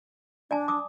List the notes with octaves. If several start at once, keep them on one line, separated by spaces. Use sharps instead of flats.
D4 D5 G#5 A5
D6 D#6